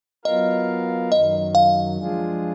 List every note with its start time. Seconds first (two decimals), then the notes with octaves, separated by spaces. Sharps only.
0.25 F#3 B3 F4 A#4 D#5 F5
1.11 F#2 D#3 F#3 D#5
1.55 F5
1.98 F3 G#3 D4 F4 G#4